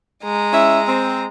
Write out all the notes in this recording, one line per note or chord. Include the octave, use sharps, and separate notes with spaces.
G#3 A#5
C#4 E4 E5
C4